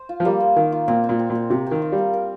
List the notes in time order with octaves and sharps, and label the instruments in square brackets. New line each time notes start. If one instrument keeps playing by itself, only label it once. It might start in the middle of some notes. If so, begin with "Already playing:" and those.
Already playing: [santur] C5
F4
[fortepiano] F3
[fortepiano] G3 [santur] A#3
[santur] A#3
[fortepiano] D#3 [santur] F5
[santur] F4
[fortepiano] A#2 [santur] C4
[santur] C4
[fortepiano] A#2
[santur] C4
[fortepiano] A#2
[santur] C4
[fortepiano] C3 [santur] C4
[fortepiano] D#3 [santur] C4
[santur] F4
[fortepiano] G3
[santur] A#4
A#4